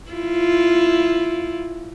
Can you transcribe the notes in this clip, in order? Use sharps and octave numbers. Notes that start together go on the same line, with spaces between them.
E4 F4